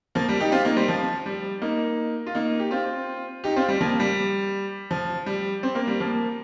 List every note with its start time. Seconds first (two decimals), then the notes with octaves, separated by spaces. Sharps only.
0.15 F3 A#3
0.29 G3
0.40 D#4 G4
0.52 C4 F4
0.64 A#3 D#4
0.77 G3 C4
0.88 F3
1.26 G3
1.62 A#3 D#4
2.26 F4
2.35 A#3 D#4
2.59 G4
2.71 C4 F4
3.44 D#4 G4
3.56 C4 F4
3.68 G3
3.81 F3 A#3
4.00 G3
4.91 F3
5.26 G3
5.63 C4
5.75 A#3
5.87 G3
6.00 F3 A#3